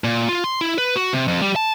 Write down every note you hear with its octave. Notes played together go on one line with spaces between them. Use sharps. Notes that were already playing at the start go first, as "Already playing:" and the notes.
A#2
F4
C6
E4
B4
F#4
C3
F2
G3
A5